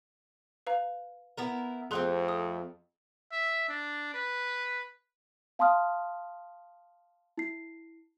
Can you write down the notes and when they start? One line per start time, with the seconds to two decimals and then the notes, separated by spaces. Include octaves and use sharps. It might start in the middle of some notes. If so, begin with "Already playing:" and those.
0.67 B4 F5 A#5
1.37 B3 E4 A#4
1.91 F2 A3 B3 C4 G#4 C6 F#6
2.29 D#6
3.32 E5
3.68 D4
4.14 B4
5.59 F5 A5 C6 D#6 F6
7.38 E4 C7